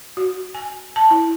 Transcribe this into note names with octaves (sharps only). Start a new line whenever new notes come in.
F#4
G#5
A5
E4